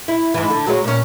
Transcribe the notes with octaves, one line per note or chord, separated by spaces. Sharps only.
E4
G#2 E3
D3
F#3 G#3 C#5
A#2 C#4